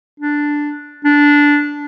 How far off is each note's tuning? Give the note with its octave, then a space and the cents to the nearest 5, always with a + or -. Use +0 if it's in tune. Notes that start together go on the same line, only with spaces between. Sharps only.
D4 +0
D4 -10